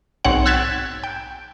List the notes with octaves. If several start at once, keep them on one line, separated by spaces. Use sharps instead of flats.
B1 G#2 C4 C#5 F#5
E6 F#6 G#6 A6 B6 E7
G5